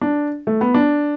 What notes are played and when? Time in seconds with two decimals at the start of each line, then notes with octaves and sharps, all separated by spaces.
0.01 D4
0.47 A3
0.61 B3
0.74 D4